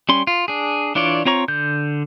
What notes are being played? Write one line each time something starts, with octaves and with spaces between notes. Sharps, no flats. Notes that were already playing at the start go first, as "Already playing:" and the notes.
G3 C#4 C6
F4
D4 G#4
E3 D4 F4 C#5 D5
C4 F4 C#5 A#5 C#6
D3 G6